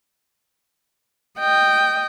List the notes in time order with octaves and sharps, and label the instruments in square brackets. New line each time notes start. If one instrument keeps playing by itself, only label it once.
[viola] D#5 G5